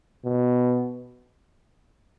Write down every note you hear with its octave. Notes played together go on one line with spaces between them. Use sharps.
B2